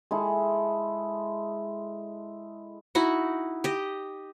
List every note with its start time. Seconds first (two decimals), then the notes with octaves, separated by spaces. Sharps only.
0.11 G#3 E4 A4
2.95 D#4 E4 F#4 F#5
3.64 G4 D#5